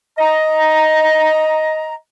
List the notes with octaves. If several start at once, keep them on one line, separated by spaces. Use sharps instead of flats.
D#5 A#5